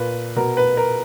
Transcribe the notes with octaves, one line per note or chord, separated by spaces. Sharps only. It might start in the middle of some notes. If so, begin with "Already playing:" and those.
Already playing: A#2 B4
B2 A#4
B4
A#4